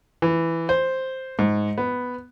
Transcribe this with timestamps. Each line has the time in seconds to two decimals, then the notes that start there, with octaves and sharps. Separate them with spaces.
0.22 E3
0.69 C5
1.39 G#2
1.78 B3